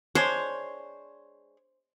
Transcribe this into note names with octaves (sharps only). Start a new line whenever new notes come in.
G#3 D4 C5 C#5